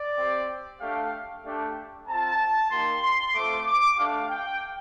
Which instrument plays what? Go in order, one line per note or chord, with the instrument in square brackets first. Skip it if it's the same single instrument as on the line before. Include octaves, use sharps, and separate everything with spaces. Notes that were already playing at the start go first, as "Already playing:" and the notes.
Already playing: [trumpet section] D5
C4 G4
A3 D4 G4 F5
A3 D4 G4
C4 F4 A5
A#3 D#4 G4 C6
C6
A3 C4 F4 D6
D6
A3 D4 G4 F5
G5